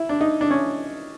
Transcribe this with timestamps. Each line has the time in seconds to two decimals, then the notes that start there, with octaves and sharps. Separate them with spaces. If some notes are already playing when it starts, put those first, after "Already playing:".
Already playing: E4
0.09 D4
0.21 D#4
0.41 D4
0.51 C#4